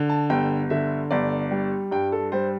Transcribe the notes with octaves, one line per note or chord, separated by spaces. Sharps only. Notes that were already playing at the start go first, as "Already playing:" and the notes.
Already playing: D3
A5
G1 G5
D3 E5
G1 D5
G3
G2 G5
A4
G3 C5